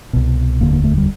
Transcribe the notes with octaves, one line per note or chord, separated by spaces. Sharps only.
C2 B2
F1 D#2 D3 A#3
A#3
A3
G3